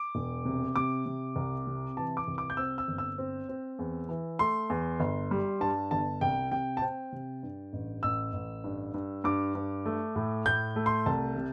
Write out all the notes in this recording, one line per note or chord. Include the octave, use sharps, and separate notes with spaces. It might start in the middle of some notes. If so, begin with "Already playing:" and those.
Already playing: D6
E1
C3
C3 D6
C3
C2
C3
E3 A5
D6
C2
D6
G6
C4 E6
E6
G1
E6
C4
C4
E2
E3
A3 C6
E2
G1
G3
G2 A5
G1 A5
C2 G5
C3 G5
A5
C4 G5
C3
G2
A1
A1 E6
A1
G2
G2
G2 D6
G2
A3
A2
A2 G6
A3
C6
C2 A5
C3